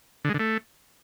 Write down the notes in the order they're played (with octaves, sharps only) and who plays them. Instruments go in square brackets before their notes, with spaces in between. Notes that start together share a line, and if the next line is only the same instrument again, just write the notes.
[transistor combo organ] D3
G#3
D3
A3